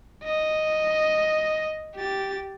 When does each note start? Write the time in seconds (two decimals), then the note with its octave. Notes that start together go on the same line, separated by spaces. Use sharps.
0.24 D#5
1.96 G4 A6